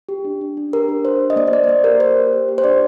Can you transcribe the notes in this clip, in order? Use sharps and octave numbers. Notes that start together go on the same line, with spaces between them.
G4
D4
D4
D4
G4 A#4
D4
D4 C5
G4
D#5
A#3 D5
C5
A#3 D5
D5
A#3 C5
G4 A#4
A#3 C5
G4
G4
G4
C5
D4 D5